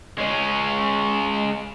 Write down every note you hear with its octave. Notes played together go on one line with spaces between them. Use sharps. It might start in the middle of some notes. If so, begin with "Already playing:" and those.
G#3 C#4